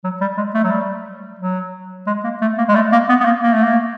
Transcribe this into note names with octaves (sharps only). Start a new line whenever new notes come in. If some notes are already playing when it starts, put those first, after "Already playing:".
F#3
G3
G#3
A3
F#3
G3
F#3
G#3
A#3
A3
A#3
G#3
A3
A#3
B3
B3
A#3
A#3
A3
A#3